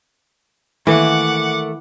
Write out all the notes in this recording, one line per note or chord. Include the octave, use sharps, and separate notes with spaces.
D#3 E3 A3 A#3 F#5 D6